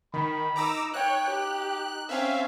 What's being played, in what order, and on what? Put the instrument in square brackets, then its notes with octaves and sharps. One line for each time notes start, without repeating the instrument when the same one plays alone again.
[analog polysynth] D#3 [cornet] B5
[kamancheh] D#4 [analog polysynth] A#5 D6 E6
[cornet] D#4 [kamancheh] C#5 G5 [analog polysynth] F#6
[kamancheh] G4
[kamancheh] C4 C#4 [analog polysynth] E5 F5